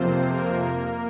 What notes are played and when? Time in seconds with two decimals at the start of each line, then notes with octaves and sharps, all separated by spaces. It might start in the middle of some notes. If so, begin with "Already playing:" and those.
Already playing: F2 C3 F3 A#3 C4 F4 C5
0.34 A#3 A#4